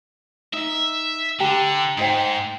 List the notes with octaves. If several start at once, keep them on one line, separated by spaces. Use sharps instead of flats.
D#4 E5
D3 G4 G5 A#5
G#2 D#4 C5 G5